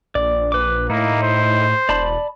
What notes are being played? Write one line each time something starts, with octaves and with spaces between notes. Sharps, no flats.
A#1 D5
B4 D6
A2 A#3 D#4 E4
C5
E1 D5 A5 B5